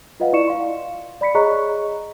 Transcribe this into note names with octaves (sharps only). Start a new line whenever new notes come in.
F4 B4 D#5 F5 F#5
E4 D5 C#6 C#7 E7
F5 C6
D5 B5 B6 C#7
G#4 C#5 D#5 A#5 C#6 F#6